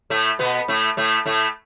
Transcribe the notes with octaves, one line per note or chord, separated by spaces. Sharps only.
A2 A3
B2 B3
A2 A3
A2 A3
A2 A3